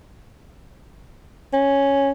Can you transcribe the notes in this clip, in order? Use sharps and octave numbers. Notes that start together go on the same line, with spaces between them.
C#4